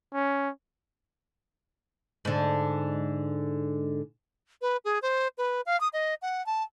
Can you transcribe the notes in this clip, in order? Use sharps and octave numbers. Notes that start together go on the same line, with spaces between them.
C#4
G#2 D3
B4
G#4
C5
B4
F5
D#6
D#5
F#5
A5